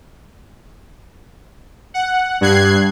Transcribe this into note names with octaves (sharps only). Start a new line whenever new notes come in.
F#5
G2 F#6 G#6 C7